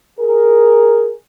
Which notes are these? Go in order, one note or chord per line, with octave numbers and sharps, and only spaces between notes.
G#4 A#4